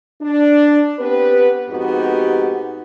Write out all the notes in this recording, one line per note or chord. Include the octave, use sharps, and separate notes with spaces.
D4
B3 C4 G4 B4
F2 G#2 B3 D#4 F#4 G4